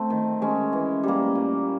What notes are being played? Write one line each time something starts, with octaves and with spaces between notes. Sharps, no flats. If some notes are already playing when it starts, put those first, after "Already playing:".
Already playing: A3 C4
D#3
G#3 C#4
E3
G3 A#3
A#2